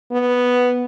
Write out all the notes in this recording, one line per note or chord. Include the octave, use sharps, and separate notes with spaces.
B3